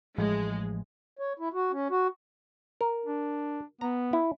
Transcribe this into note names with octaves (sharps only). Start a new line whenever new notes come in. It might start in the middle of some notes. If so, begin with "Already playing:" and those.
A1 A2 F3 G#3
C#5
E4
F#4
C#4
F#4
A#4
D4
B3 A#5
E4